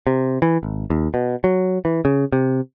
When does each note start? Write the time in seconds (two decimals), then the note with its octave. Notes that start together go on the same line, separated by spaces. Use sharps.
0.07 C3
0.42 E3
0.63 G#1
0.90 D#2
1.14 B2
1.44 F#3
1.85 E3
2.05 C#3
2.32 C3